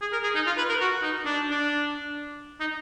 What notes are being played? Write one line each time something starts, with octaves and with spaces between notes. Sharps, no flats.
G#4
A#4
G#4
D#4
F4
B4
A#4
F#4
D#4
D4
D4
D#4